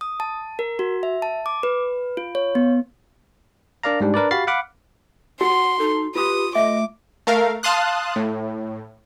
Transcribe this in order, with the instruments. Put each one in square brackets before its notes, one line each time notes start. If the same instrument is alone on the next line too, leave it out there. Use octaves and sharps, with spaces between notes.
[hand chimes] D#6
A5
A#4
F#4
E5
A5
D6
B4
F4
C#5
B3
[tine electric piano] D4 A#4 D5 F5 A#5
G#2 G3 D4
D4 A#4 B4 D5
F#4 G4 F5 B5 A6 C7
F5 F#5 B5 D6
[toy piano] F#4 [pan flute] F#5 [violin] C6
[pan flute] D#4 [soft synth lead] A4
[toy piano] F4 C6 [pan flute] G4 [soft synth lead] B4 [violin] D#6
[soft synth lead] A3 [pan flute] D#5 [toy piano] E5 [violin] D6
[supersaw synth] A3 A#4 F5
F5 A5 C6 D#6 F#6
A2